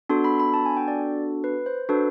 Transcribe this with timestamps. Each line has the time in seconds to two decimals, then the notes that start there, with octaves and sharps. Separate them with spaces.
0.09 B3 D4 F#4 A4 C6
0.24 B5
0.40 B5
0.54 A5
0.66 G#5
0.77 G5
0.88 D5
1.44 B4
1.66 C5
1.89 D4 F#4 A4 B4